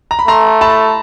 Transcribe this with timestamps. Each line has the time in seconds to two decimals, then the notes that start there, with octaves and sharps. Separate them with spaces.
0.11 A#5
0.19 B5
0.28 A3 A#5 C6
0.61 A5 B5